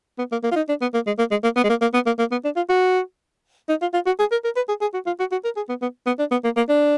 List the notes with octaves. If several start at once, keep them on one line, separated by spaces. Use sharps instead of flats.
B3
A#3
A#3
F4
D#4
D4
B3
A#3
G#3
A#3
G#3
A#3
B3
G#3
A#3
A#3
B3
A#3
A#3
B3
D4
F4
F#4
D#4
F4
F4
F#4
G#4
A#4
A#4
B4
G#4
G#4
F#4
F4
F#4
F#4
A#4
G#4
B3
B3
B3
D4
B3
A#3
A#3
D4